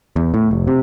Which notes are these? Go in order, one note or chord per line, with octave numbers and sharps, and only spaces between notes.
E2
A2
F1
C3